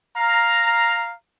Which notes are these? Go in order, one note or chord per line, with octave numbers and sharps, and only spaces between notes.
F5 A#5